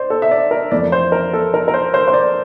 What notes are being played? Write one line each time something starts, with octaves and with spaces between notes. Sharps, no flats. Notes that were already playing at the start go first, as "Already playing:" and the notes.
Already playing: C5 D5
A4
E5
D5
A#4
F2 E3 A3 D5
C5
A#4
A4
A#4
A#4
C5
C5
C5
D5